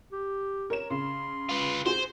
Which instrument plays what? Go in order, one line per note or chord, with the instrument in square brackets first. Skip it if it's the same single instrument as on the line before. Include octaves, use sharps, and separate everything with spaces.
[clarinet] G4
[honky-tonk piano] A#4 C#5 E7
[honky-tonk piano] C#3 [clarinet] C6
[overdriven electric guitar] F4 B4
[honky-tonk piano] F#4 G#4 [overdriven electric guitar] C5